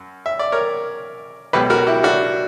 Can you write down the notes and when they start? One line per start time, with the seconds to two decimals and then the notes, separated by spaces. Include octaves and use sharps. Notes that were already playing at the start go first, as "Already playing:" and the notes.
Already playing: F#2
0.26 E5
0.39 D5
0.52 A#4 C#5
1.53 C#2 B2 F#3 G4 B4
1.70 F#4 A#4
1.87 E4 G4
2.03 D4 F#4